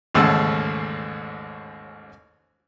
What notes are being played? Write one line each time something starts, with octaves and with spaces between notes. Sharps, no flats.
A1 D#2 G#2 C#3 A3 E6